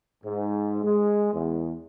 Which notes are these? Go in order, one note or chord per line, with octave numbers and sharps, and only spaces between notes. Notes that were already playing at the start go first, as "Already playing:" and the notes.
G#2
G#3
E2